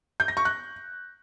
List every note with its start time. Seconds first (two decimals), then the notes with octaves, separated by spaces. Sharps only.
0.20 G6
0.28 A#6
0.37 C#6
0.45 F#6